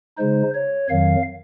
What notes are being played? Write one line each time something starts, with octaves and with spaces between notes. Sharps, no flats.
C#3 G#3 D#4 C5
C#5
F2 D#3 F#3 F5